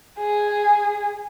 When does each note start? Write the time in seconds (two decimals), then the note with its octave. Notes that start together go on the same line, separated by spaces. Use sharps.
0.18 G#4